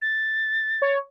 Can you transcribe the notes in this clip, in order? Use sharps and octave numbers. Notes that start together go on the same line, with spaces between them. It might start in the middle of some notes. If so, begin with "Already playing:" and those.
A6
C#5